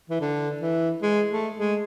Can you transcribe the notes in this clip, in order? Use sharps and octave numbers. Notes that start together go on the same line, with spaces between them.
E3
D3
E3
G#3
A3
G#3